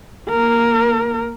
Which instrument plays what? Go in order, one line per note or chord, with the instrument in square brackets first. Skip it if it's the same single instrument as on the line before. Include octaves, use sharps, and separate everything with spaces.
[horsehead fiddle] A#3 A#4